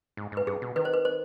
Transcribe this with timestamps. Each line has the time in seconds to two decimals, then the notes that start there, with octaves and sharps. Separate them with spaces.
0.17 G#2
0.32 G#2 B4
0.47 G2 G#4
0.62 B2
0.76 D#3 B4
0.85 C5
0.94 B4
1.05 C5